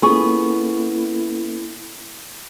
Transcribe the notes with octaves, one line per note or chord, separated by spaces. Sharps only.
A#3 B3 C#4 E4 F4 G#4 A4 C#6